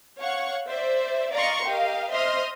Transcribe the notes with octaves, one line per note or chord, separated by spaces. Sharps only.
C#5 F5 F#5 C#6
C5 D5 E5
D5 D#5 F5 A#5 C6 C#6
G4 A#4 D#5 F5
C5 D#5 E5 C6 D#6 F6